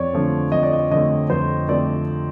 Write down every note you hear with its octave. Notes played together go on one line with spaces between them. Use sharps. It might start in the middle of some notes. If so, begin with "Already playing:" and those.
Already playing: F2 C#5 D5
D3 F3 A3 C4
F2 D#5
D5
D#5
D3 F3 A3 C4 D#5
F2 C5
D3 F3 A3 C4 D5